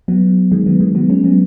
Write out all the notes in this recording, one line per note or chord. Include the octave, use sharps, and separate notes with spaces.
F#3 B3
D#3 G#3
F#3 B3
D#3 G#3
F#3 B3
G#3 C#4
F#3 B3